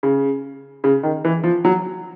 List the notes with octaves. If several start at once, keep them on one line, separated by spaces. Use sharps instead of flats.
C#3
C#3
D#3
E3
F3
F#3